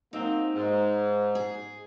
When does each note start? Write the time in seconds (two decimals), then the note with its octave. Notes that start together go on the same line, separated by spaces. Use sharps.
0.13 F#3 A#3 C4 D#4
0.55 G#2
1.35 G#4